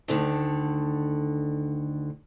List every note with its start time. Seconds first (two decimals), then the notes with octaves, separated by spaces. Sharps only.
0.08 D2 D3 D#3